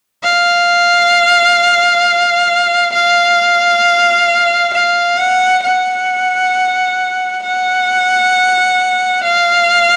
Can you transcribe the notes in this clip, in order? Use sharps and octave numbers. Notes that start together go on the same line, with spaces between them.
F5
F5
F5
F#5
F#5
F#5
F5